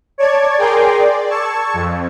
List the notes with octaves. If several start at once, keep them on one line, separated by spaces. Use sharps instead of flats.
C#5 D5 A5 G#6
G#4 A#4 G5 C6 D6
D5
A5 C#6 E6 G#6
F2